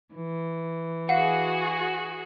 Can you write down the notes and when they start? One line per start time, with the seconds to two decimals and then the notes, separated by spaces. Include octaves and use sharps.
0.15 E3
1.09 F#4 G#4 F5 F#5